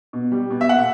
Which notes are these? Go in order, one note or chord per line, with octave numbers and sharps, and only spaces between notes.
B2
G3
B2
E5
A#2 F#5